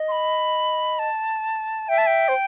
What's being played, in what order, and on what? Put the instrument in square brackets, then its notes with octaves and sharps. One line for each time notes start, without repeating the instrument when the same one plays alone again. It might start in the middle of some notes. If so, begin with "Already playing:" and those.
Already playing: [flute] D#5
[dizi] C6
B5
A5
[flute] E5 [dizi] G5
[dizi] A5
G5
[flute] C5